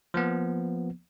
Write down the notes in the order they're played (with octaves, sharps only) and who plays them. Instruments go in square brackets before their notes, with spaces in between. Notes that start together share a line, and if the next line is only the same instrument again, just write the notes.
[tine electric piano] F3 A#3 B3